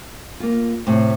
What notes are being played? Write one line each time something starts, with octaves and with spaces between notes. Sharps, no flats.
A#3 F4
A2 C3 C5